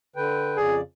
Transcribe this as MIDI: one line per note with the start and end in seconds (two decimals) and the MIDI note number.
0.16 0.57 50
0.16 0.57 71
0.16 0.57 79
0.57 0.81 41
0.57 0.81 49
0.57 0.79 68
0.57 0.81 74